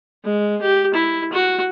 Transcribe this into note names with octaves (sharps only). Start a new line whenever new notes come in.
G#3
G4
E4
F#4